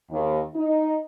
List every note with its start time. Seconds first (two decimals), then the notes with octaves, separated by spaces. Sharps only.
0.10 D#2
0.55 D#4